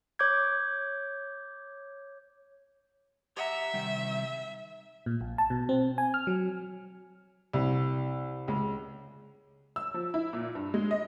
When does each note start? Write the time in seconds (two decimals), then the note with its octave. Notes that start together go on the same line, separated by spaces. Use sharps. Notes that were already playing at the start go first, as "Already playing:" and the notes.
0.19 C#5 D6 G6 G#6
3.37 G4 E5 F#5 A#5
3.74 C3 D#3 G3
5.06 A#2
5.21 A#1
5.38 A5
5.50 B2
5.69 C4
5.98 G#5
6.14 F6
6.27 F#3
7.53 C2
8.48 C#2
9.76 E6
9.94 F3
10.14 E4
10.33 A#2
10.55 G2
10.74 G#3
10.91 D#5